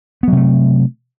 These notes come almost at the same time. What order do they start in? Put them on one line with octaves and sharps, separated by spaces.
B3 F#3 C3 A3